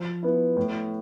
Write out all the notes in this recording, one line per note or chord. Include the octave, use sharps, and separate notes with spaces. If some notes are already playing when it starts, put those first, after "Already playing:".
Already playing: F3
B3 E4
A2